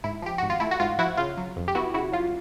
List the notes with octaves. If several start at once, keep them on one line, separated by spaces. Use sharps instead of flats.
G#2 E4
F3 G4
G#1 F#4
F4
A3 E4
F#4
G#2 F4
F3 E4 F#4
C#3 F4
F#3
F2
G4
B3 E4 F#4
C#3 E4 F#4
F#3 F4